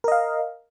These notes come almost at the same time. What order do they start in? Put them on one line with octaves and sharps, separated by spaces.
A#4 D#5 F5